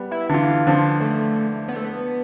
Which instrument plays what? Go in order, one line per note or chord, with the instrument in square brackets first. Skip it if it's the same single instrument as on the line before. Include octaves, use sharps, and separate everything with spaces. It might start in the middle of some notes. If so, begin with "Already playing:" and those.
Already playing: [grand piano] G3 B3
[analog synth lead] E4
[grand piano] D3
[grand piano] E3 [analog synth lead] F4
[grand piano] D3 F3
[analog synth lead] A3
B3
A3
B3